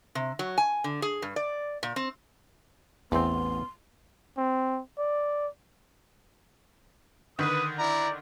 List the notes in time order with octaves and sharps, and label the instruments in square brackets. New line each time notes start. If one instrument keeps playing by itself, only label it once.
[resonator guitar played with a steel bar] C3
F#3
G#5
D3
G#4
G2
D5
A#2
C4
[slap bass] A1 [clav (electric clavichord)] E2 C4 [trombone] B3 [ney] C6
[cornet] C4
D5
[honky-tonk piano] D3 D#3 [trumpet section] B4 [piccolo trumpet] D#6
[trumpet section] E4 A#5 [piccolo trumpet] D5